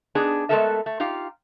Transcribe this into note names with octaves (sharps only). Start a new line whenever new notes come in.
B3 D4 D#4 G#4
G#3 A3 B3 A4 A#4 E5
A3
D#4 F4 G4 F5